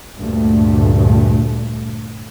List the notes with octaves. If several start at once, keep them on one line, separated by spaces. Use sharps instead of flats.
D2 G2 A#2 A3